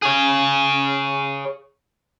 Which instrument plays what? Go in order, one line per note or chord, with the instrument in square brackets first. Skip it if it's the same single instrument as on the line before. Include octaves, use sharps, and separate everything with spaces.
[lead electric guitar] G#4 C#5